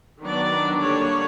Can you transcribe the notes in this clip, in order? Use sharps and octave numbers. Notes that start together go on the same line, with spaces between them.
D#3 F#3 B3 D4 D5
D3 G3 A#3 D4 C#5